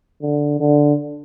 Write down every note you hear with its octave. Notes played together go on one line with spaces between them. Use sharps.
D3
D3